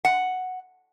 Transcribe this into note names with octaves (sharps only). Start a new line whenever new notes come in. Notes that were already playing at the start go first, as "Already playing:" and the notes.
F#5